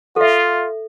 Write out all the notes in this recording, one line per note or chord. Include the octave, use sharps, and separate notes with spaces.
F4 A4 E5